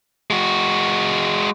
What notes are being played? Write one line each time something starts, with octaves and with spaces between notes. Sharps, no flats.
G#3 F#4